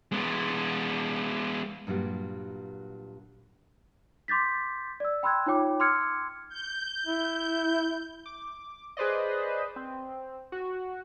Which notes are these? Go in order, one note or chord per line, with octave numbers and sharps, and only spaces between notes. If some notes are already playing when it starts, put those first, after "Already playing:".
G#3 B3
G2 A#2 F#3 G4
C6 D6 G6 A6 B6
D5 E6
G5 B5 C6 E6 F#6 G#6
D#4 F4 C#5 G5 D6
C6 D6 E6 F6 G#6 C#7
G6
E4
D6
G#4 B4 C5 D5 D#5
C4
F#4